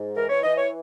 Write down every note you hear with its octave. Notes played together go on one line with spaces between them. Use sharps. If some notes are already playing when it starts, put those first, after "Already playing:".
Already playing: G#2
E3 A#4
C#5
E3 D#5
C#5